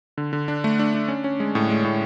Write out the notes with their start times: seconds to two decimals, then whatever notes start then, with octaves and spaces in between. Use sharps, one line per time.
0.18 D3
0.33 D3
0.48 D4
0.64 A3
0.79 D4
0.94 D4
1.08 C#4
1.24 C#4
1.40 G#3
1.55 A2
1.70 G#3
1.85 A2